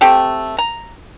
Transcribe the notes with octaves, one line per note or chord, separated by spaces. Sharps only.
A3 C4 G4 A4
A#5